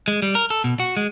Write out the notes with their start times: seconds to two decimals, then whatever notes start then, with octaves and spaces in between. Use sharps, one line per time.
0.08 G#3
0.22 G3
0.35 A#4
0.50 A4
0.64 B2
0.80 F#4
0.97 G#3